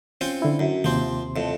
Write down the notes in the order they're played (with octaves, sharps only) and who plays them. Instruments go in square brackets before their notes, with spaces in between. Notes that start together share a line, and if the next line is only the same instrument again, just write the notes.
[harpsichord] C4 C#4 F4
[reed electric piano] D3 E4
[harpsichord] F#2
[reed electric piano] D#2 C3 C6 [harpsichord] F3 C4
[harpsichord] F2 A2